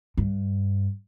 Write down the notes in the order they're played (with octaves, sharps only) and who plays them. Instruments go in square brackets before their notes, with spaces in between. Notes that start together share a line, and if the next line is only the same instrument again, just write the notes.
[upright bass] G2